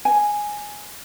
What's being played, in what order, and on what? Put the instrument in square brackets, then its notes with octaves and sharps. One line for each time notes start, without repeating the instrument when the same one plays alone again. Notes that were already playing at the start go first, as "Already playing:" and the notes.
[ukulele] G#5